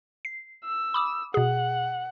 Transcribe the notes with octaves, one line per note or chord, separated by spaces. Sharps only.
C7
E6
B5 D6 D#6
B2 G#4 F#5